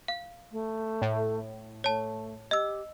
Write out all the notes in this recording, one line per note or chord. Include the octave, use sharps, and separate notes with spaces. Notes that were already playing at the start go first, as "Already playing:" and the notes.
F5
A3
A2
A3 C#5 A5
G4 D#5 E6